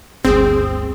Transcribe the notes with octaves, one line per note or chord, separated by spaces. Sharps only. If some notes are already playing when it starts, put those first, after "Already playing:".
G1 D2 C4 G#4